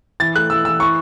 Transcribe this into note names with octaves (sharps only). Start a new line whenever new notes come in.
E3 A6
A3 F#6
E3 E6
E3 E6
E3 C#6